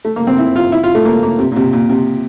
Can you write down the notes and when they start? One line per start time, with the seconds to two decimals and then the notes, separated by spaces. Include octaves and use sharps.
0.05 A3
0.16 A#3
0.27 C4
0.38 E4
0.56 F4
0.72 E4
0.84 F4
0.95 A3
1.05 A#3
1.23 A#3
1.39 C3
1.52 A#2
1.56 C3
1.73 A#2
1.90 C3